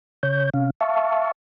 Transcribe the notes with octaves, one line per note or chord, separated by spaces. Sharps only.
C#3 C#5 G6
C3 C#4 F5
E5 F5 A5 C#6